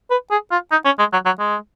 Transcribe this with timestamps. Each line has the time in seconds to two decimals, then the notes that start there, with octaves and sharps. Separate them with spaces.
0.10 B4
0.31 G#4
0.51 F4
0.71 D#4
0.85 C#4
0.99 G#3
1.12 F#3
1.25 F#3
1.39 G#3